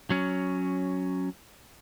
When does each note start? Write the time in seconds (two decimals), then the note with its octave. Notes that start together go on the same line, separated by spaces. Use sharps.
0.10 F#3 C#4